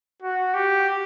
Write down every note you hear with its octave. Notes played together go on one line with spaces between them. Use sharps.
F#4
G4